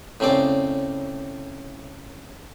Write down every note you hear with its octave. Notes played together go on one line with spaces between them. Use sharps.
A2 C#3 C4 D5